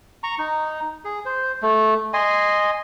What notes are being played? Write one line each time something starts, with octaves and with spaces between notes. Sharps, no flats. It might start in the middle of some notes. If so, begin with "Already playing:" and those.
A#5 C#6
D#4
G#4
C5
A3
D#5 G#5 C6